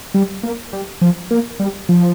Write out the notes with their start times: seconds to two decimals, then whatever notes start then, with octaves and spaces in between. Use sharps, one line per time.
0.14 G3
0.43 A#3
0.73 G3
1.01 F3
1.31 A#3
1.59 G3
1.89 F3